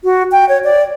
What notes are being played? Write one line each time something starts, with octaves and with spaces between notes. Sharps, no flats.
F#4
G5
C#5
D5